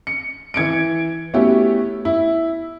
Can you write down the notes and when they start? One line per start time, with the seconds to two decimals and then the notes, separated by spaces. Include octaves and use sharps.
0.07 C#7
0.54 E3 G#6 C#7 D7
1.34 A3 B3 C#4 E4 F#4 G4
2.05 E4